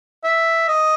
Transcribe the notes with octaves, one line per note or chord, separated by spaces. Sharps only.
E5
D#5